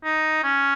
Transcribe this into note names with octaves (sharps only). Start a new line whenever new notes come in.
D#4
C#4